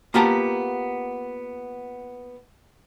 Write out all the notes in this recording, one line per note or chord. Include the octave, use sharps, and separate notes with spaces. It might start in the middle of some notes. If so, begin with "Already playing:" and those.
A#3 B3 F4 G4 A5 A#5